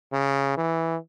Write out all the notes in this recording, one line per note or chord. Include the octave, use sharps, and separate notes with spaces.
C#3
E3